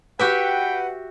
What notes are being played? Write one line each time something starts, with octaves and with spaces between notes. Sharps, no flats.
F#4 G4 B4 E5 F#5 G5